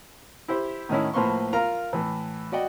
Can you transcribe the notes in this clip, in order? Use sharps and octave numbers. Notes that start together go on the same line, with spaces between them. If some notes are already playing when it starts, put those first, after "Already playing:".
E4 G4 C5
A2 D#3 C#4 E4
A2 F3 A#3 B4 C6 C#6
F4 A#4 A#5
A2 E3
F#4 D5 D#5 F#5 G5